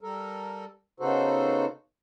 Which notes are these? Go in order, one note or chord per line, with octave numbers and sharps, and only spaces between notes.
G3 A4 A#4
C#3 B3 D#4 F#4 A4 C5